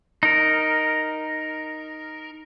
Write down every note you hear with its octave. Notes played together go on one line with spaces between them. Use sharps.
D#4 A#4